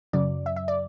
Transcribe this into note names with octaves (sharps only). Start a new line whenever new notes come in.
F#2 C#3 F#3 D5
E5
E5
D5